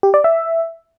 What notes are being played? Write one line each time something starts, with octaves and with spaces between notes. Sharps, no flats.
G4
D5
E5